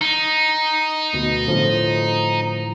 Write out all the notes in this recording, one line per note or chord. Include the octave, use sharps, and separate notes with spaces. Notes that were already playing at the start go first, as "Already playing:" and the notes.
D#4
D2 B2
A2 D3 F3